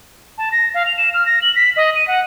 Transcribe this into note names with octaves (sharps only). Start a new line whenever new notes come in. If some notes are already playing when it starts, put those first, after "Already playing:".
A5
A#6
F5
F7
E7
F6
A#6
F#7
B6
D#5
D#7
F#5